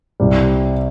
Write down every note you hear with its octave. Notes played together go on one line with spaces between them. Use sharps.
C2 C3 G3